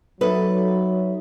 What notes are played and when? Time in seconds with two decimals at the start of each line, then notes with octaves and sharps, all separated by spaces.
0.21 F#3 D#4 A4 B4 E5